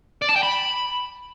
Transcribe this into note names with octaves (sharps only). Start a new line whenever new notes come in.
D5
A5
G5
B5